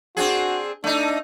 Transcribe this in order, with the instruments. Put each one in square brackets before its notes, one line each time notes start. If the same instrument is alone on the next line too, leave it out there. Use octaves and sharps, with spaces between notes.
[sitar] C4 D4 G#4 [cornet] F#4
[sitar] A3 D#4 [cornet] D4